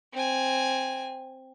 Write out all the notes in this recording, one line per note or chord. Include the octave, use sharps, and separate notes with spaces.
C4 G#5